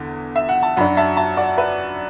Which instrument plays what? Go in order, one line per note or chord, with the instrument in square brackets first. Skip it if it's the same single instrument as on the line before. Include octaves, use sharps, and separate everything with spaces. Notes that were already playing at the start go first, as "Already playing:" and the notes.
Already playing: [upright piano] E2 D3
E5
F#5
A5
F#2 F#3 D4 F#5 B5
E5 A5
E5 A5
D5 F#5
B4 E5